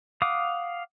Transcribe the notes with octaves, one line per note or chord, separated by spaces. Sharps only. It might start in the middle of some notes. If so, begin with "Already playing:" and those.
F5 F#5 D6 D#6